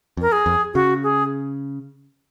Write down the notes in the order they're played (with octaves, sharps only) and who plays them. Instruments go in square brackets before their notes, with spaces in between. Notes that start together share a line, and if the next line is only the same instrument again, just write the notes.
[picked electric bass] F2
[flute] A#4
G#4
[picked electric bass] F2
[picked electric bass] C#3 [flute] F#4
[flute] G#4